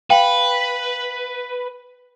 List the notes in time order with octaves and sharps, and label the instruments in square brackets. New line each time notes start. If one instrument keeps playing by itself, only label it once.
[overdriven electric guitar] B4 [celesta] F5 F#7 [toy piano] G5